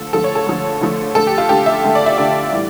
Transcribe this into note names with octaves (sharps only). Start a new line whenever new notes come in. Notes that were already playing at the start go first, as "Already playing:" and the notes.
Already playing: D3 F3 A3 A4
D3 F3 A3 A4
C#5
A4
D3 F3 A3
D3 F3 A3
D3 A3 A4
G4
F4
D3 A3 G4
E5
D3 A3
D5
E5
D3 A3 D5
A2 E3 G3